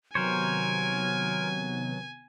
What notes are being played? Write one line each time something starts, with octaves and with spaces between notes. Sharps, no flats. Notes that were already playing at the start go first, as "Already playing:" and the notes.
C3 D#3 F#3 B3 A#4 C5 C#5 G#5